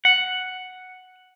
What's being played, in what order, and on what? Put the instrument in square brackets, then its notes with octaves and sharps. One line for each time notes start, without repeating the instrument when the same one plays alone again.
[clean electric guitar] F#5